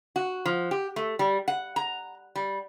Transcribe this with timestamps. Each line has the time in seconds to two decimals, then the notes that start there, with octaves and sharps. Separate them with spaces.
0.16 F#4
0.46 F3
0.71 G4
0.96 A3
1.19 G3
1.48 F#5
1.76 A#5
2.36 G3